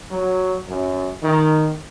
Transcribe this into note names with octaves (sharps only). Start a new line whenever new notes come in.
F#3
F#2
D#3